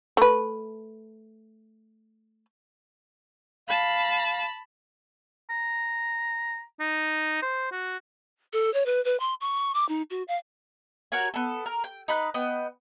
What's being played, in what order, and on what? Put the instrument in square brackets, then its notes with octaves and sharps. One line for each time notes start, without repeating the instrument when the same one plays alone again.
[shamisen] A3 B4
[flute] F5 [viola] A5 B5
[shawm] A#5
D#4
C5
F#4
[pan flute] A4
C#5
B4
B4
C6
C#6
D6
D#4
F#4
F5
[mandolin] F#4 A#4 C#5 G#5
B3 A4
A#4
G5
D#4 B4 F#6
B3 D#5 G5